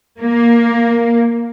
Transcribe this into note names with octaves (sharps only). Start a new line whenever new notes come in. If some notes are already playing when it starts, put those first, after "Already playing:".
A#3